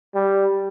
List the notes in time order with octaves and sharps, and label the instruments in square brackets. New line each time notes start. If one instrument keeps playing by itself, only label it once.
[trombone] G3